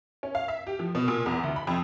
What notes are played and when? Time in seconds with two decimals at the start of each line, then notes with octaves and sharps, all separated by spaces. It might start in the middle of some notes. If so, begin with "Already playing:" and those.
0.23 C#4
0.35 F5
0.48 E5
0.67 G4
0.79 F3
0.95 B2
1.08 A#2
1.26 E2
1.43 D2
1.56 B5
1.67 F2